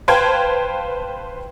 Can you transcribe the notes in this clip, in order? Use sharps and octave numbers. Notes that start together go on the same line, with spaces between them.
B4 C5 F5 G5 A5 G#6